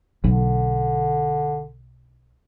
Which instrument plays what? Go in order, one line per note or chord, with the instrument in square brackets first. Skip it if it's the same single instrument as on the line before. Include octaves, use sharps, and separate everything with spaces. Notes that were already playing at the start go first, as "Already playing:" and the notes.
[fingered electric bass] B1 [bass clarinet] D3